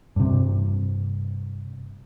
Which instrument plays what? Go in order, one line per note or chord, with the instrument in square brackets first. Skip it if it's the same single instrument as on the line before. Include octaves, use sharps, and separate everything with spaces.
[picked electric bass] G2 C3